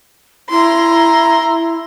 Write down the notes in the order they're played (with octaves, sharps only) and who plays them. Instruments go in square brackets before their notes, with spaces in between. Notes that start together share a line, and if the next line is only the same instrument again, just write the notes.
[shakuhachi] E4 [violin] A#5 C6